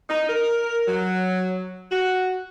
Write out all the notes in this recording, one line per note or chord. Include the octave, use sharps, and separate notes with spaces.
D#4
A#4
F#3
F#4